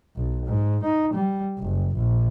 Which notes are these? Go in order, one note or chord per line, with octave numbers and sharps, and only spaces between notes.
B1
G#2
D#4
G3
F#1
A#1